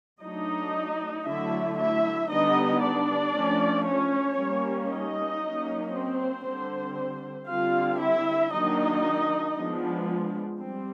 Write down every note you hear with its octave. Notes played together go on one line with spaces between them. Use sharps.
F#3 A3 D4 D#4 D#5
D3 F#3 A3 D4 E4 E5
E4 E5
D3 G3 B3 D4 D#4 D#5
D4 D5
F3 A3 C#4
C#4 C#5
G3 A#3 C#4
D#4 D#5
F#3 A#3 C#4
C4 C5
D3 G3 C4
D3 G3 C4 F4 F5
E4 E5
D#3 F#3 A#3 D4 D#4 D#5
F3 G#3 B3 D4
G3 C4